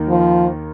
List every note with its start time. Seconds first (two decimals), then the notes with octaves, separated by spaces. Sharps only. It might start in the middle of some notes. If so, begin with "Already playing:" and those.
Already playing: D#2 D#3 A#3 D#4
0.08 F3